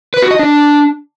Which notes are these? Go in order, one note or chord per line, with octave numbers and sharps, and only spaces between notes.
B4
F#4
D#5
D4